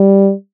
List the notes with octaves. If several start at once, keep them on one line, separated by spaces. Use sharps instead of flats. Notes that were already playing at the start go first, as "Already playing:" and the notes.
Already playing: G3